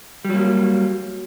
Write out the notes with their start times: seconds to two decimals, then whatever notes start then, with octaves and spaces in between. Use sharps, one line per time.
0.25 G3
0.29 F#3
0.34 A#3